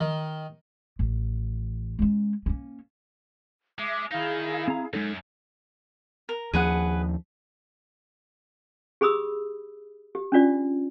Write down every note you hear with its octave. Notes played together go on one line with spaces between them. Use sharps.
D#3
A1
G#3 C#4
A#3 C#4
G#3 E5 D6
D#3 D#4 E4 G#4 F5
C4 A#5
F#2 G#3 D#4 A4
A#4
D#2 F3 G#4 B4 F#5
G4 G#4 B5 D#6 E6
G4
C#4 D4 F4 D5